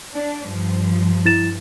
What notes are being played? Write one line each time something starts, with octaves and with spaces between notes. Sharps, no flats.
D4
G2 F3
E4 A6 E7